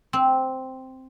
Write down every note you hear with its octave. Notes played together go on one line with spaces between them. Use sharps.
C4